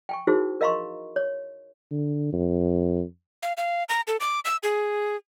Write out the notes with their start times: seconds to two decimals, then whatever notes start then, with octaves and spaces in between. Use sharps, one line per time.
0.09 G5 G#5 C#6
0.27 D#4 E4 F#4 G#4 A#4 C5
0.61 A#4 D#5 F5 A#5 C6 C#6
1.16 C#5
1.91 D3
2.33 F2
3.43 F5
3.57 F5
3.89 A#5
4.08 A4
4.20 D6
4.45 E6
4.63 G#4